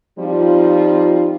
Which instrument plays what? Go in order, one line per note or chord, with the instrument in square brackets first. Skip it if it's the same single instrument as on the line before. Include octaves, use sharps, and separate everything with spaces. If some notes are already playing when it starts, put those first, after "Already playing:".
[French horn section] F3 G3 C4 D#4 F4